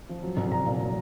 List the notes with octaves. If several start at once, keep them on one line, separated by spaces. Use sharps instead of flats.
F3
F#3
C2
C2 A#5
A#2
F#3